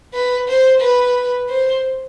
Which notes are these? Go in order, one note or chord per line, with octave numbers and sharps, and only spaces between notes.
B4
C5
B4
C5